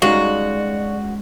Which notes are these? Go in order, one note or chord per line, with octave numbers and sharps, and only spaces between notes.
G#3 C#4 D#4 F#4 G4 D5 F5